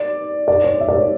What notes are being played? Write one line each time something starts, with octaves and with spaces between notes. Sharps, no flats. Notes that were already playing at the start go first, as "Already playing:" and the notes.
Already playing: D5
D5
C#5
E5
D5
C#5